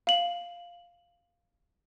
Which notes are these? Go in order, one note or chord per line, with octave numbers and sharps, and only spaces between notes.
F5 F#7